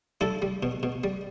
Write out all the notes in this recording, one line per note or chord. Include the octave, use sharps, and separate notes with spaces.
G3 E4 A4
G3
B2
B2
G3